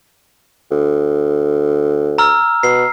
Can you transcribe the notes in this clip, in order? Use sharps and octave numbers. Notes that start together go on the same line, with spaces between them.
D2
A#5 E6 F6
B2 C7